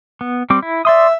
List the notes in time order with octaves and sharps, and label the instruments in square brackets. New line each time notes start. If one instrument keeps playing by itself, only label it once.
[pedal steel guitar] B3
G3 C4 D6
E4
[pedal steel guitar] D5 C6 D#6 [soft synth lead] E5